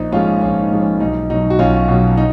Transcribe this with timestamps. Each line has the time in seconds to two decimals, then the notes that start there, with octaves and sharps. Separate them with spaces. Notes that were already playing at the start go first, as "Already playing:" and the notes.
Already playing: A#1 D#4
0.12 G#2 F3 G#3 C#4 F4
0.41 A#1 C#4
0.61 D#4
0.71 G#2 F3 G#3
0.81 C#4
1.00 B1 D#4
1.30 B2 F#3 D#4
1.50 F#4
1.59 B1 C#4 F4
1.88 B2 F#3
2.17 D#4